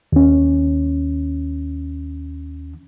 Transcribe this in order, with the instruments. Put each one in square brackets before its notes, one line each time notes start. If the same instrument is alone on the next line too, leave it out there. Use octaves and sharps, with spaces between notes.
[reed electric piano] D#2 C#4